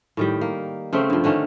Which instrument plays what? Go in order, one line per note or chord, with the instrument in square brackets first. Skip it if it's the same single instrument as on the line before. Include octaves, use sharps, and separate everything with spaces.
[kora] A2 D#3 G3
A#3
C#3 A3 C4
G2 F3
D3 D#3 A3 C#4